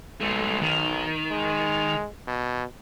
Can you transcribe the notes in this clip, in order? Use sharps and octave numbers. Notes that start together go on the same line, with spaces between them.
B1 G#3 A3
D#3
G#3
B2